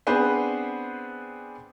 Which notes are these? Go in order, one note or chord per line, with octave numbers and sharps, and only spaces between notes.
B3 C4 D4 G#4 B4 C5